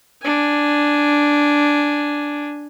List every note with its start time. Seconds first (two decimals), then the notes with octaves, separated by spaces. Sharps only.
0.22 D4 G#5